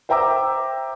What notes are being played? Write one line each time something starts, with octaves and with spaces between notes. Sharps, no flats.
C5 E5 G5 A#5 D6 E6